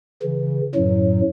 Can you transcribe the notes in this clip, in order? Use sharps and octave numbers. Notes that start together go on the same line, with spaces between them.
C#3 E3
F#2 A2 F#3